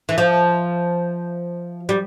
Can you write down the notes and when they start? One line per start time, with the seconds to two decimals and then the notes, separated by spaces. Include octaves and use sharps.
0.09 E3
0.18 F3
1.89 G3